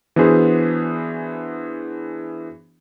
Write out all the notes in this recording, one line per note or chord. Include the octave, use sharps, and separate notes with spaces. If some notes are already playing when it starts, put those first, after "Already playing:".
E3 B3 D4 F#4 G#4 C5